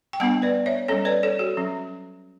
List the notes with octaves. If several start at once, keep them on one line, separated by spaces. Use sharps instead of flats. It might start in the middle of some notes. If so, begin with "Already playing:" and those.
G5
G3 B3 D4 F#5 A5
B4 D5
C#5 E5
G3 C#4 A4 C#5
B4 D5
A4 C#5
F#4 A4
F#3 C#4